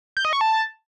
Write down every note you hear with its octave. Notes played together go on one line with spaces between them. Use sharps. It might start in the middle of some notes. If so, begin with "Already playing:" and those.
G6
D#5
C#6
A5